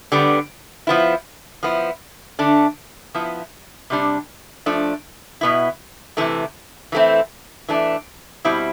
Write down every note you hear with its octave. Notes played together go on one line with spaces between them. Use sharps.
D3 G3 B3
F3 B3 E4
F3 B3 E4
D3 A3 D4
F3 B3 E4
C3 G3 D4
F3 A3 D4
B2 B3 E4
C3 E3 A3
E3 A3 C4 E4
E3 A3 D4
B2 G3 C4 E4